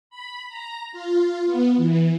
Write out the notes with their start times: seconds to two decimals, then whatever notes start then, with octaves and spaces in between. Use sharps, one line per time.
0.10 B5
0.48 A#5
0.92 F4
1.46 B3
1.77 E3